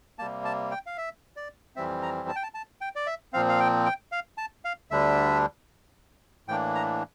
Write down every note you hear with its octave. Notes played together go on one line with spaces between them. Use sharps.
C3 G3 A#3 A5
A5
G5
F5
E5
D5
F2 E3 G3 C4 E5
A#5
A5
G5
A5
A5
G5
D5
E5
A#2 F3 C4 F5
F5
G5
G5
F5
A5
F5
D2 D3 G3 D4 E5
A2 E3 A#3 D4 G5
A#5